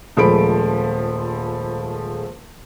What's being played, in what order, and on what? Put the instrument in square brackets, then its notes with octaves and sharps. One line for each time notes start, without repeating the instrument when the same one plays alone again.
[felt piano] D#1 F3 G#3 A3 B5 D7